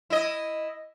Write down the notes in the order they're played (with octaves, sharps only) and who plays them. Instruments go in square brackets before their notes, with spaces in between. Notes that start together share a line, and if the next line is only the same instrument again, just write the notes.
[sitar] E4 D#5